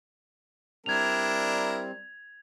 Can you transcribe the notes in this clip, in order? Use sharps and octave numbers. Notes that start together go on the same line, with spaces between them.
G3 C4 D4 E4 A#4 G#6 F7